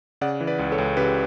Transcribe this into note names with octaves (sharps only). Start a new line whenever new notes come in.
C#3 D5 F#5
E3
B4 D5
C#2
A4 C#5
C#2
C#3 G4 B4